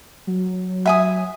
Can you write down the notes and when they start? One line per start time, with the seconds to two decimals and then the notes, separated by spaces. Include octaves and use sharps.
0.27 F#3
0.86 E5 G#5 D#6